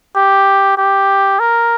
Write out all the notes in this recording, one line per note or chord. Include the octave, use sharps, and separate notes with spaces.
G4
G4
A#4